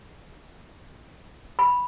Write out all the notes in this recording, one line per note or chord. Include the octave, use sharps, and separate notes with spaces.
B5